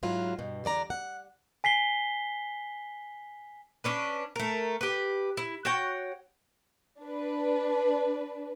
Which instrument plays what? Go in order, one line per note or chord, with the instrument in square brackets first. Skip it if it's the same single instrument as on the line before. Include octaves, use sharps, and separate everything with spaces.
[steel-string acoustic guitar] G#2 F#3 E4 F4
G2 B2
E2 D3 D5 A#5
F#5
[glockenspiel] G#5 B6 C7 G7
[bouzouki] C#4 D4 B4
A3 A#4
G4 B4
E4
F#4 C#5 F#5 G5
[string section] D4 B4